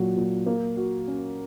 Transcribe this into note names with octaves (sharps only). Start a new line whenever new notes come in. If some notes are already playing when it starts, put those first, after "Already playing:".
Already playing: A#2 F#3
A#2
A#3
F#4
C#4